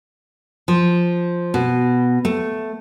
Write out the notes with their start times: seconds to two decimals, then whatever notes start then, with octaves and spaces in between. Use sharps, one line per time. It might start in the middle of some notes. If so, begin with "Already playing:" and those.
0.68 F3
1.54 B2
2.25 A3